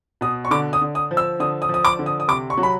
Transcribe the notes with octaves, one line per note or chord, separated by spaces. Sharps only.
B2 D#6
C#6
D3 D6
D#6
D3
D#6
F3
E6
D3 D#6
D#6
F3
D#6
D6
D3
D#6
D#6
C3 D6
C#6
F#3
B5